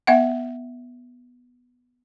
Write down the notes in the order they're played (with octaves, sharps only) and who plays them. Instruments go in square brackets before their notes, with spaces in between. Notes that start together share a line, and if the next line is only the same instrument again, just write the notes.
[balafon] B3 E5 F#5